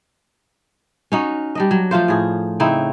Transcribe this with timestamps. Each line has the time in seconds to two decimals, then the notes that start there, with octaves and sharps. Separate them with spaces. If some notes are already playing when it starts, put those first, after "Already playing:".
1.12 C#4 D#4 F#4
1.55 G3 D4 D#5
1.71 F#3
1.91 F3 A3 F4 C5
2.08 A2 G#4
2.60 C#3 C4 D#4 E4